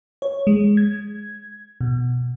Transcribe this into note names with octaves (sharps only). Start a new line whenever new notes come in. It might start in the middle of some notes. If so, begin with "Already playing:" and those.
C#5
G#3
G#6
B2